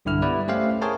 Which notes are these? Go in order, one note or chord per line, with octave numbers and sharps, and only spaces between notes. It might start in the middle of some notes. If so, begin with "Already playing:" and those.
B1 G2 D3 E4 F6
G3 B3 E4 B4 D5
A3 C#4 G4 C5 E5 F5
G#4 A#4 C#5 G5 A5